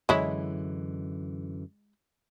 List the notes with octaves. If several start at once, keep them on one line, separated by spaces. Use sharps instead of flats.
F#2 D3 E3 G#3 E4 C#5